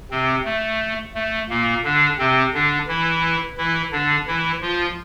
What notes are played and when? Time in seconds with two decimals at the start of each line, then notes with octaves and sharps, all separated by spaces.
0.11 C3 C4
0.45 A3
1.15 A3
1.50 A#2 A#3
1.84 D3 D4
2.18 C3 C4
2.54 D3 D4
2.88 E3 E4
3.58 E3 E4
3.92 D3 D4
4.27 E3 E4
4.61 F3 F4